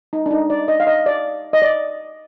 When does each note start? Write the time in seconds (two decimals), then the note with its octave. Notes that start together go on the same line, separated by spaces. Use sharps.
0.13 D#4
0.26 D4
0.31 D#4
0.50 D5
0.68 D#5
0.80 F5
0.87 D#5
1.06 D5
1.53 D#5
1.62 D5